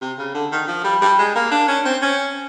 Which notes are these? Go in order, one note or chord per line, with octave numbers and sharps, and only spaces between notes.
C3
C#3
D3
D#3
F3
G3
G3
G#3
A#3
D4
C#4
C4
C#4